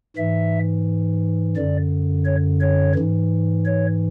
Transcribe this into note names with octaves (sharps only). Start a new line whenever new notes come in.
G#2 E3 E5
F#2 D3 D5
C#5
C#5
G#2 E3
C#5